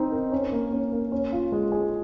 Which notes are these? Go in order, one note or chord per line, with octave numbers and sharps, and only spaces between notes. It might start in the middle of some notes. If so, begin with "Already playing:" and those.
Already playing: C4 D#4 D#5
A#4
C#4
A#3
C#4
A#3
C#4
F4
G#3
G#4